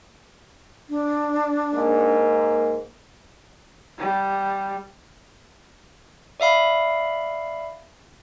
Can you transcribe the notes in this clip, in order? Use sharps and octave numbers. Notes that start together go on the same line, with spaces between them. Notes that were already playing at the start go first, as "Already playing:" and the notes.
D4
G#2 A#3
G3
D5 E5 F5 B5